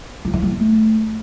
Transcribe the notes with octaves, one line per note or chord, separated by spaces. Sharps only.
F3
E3
G3
B3
A3